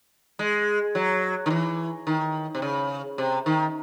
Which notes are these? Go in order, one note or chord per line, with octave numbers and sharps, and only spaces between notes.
G#3
F#3
D#3
E3
D#3
C3
C#3
C3
D#3